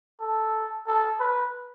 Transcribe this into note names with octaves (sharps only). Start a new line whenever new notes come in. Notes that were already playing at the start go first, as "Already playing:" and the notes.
A4
A4
B4